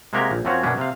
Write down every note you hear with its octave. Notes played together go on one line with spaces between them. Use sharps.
C3 G#3 A#3 F#4 G4 A#4
A#1
F#2 F3 C4 C#4 F#4 C#5
F#2 B2 C#4 D4
C3 F5